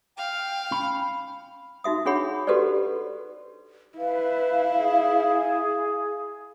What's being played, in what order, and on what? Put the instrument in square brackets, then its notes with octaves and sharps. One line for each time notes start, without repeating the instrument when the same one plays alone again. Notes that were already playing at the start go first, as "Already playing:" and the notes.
[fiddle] F5 [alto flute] G5
[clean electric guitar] C#4 B5
[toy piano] D#4 F#4 E5 D#6
D4 F#4 G#4 C#5 F#5 B5
F#4 G4 A4 B4 C5 D5
[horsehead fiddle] E4 [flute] B4 [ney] F5
[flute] G#4